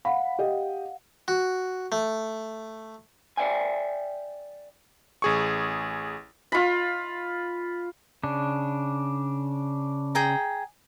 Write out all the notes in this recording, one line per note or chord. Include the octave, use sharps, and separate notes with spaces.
F5 F#5 B5
G4 D#5
F#4
A3
D5 E5 G5 G#5
A1 G#4 C#6
F4 B5
C#3 D4
G#4 G5 A#5